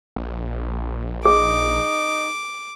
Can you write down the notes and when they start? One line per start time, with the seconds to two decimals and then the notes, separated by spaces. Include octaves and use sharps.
0.16 A#1
1.25 D#4 G#4 D6